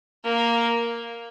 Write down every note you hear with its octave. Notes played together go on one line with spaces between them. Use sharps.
A#3